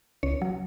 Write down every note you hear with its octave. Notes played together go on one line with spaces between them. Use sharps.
C#2 C#5
F#3